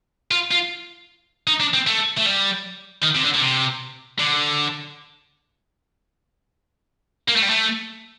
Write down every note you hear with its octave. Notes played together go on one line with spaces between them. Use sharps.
F4
F4
D#4
D4
C4
A3
A3
G3
D#3
C3
D3
D3
C3
D3
A#3
A3
G3
A3